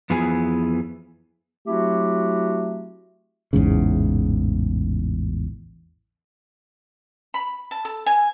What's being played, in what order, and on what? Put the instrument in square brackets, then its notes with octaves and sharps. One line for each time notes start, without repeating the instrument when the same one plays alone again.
[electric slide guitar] F2 E3 B3 F4 G#4 G#5
[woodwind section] F#3 A3 C4 E4 F#4 G4
[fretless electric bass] A1 E2 G#2 C#3
[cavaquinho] B5
A5
A4
G#5